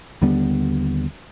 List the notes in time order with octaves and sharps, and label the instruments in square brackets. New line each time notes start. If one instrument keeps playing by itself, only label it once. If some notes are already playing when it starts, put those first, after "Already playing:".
[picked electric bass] D#2 D3 G3 B3